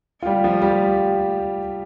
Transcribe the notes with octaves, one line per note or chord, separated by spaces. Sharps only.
F4
G3 G4
F3 F4
G3 G4